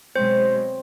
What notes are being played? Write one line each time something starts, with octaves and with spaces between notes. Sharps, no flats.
B2 F#3 G#3 C4 C5 C#5